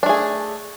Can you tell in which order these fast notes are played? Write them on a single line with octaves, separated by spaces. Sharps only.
D4 A3 G#4